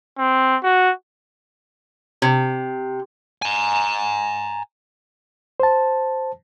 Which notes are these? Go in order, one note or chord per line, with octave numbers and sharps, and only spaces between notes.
C4
F#4
C3
G#5 A#5
C5 A5